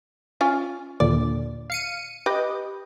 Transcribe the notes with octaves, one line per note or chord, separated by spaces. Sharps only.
C#4 F4 G#5
D#2 A#2 D3 D5
F5 C#7 D#7
G4 B4 D#5